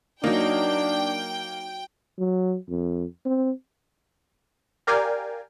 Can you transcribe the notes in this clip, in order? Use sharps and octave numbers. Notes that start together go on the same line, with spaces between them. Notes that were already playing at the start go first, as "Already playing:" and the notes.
F#3 A#3 D4 D#4 G5
F#3
F2
C4
G4 A#4 D5 F5 G5 G#5